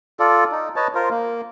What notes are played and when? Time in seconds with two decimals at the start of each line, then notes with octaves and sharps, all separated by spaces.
0.20 F4 A4 D5
0.52 D#4
0.76 B4 C#5 D#5 A5
0.95 F4 A#4 C5
1.10 A#3